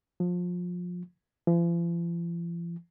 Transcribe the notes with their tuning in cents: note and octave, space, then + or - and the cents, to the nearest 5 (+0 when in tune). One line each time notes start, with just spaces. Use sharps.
F3 +25
F3 -45